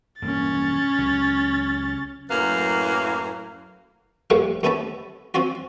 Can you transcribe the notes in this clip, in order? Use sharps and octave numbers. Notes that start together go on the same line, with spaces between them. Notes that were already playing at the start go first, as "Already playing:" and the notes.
E1 G2 A#3 C#4 A6
C#2 F#3
F#2 A2 F#3 A#3 B4 F5
G2 A#2 D3 F3 G3 A3
D#2 A3 B3 C#4 A4 E5
C4 C#4 F4 F#4